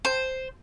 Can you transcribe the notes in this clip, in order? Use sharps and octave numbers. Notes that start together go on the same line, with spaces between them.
C5